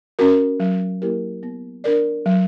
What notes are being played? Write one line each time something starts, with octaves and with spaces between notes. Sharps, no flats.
C#4 F#4 A#4
F#3
A#3 E4 G4 A#4
B3
D4 A#4 D5
F#3